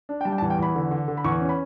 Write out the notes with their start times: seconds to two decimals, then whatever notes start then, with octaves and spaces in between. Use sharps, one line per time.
0.09 D4
0.21 G5
0.25 G3 A5
0.32 G5
0.38 A5
0.42 E2
0.50 G5
0.59 E2 B5
0.75 D3
0.91 D3
1.08 D3
1.17 B5
1.24 E2 C#6
1.41 C#4
1.49 B5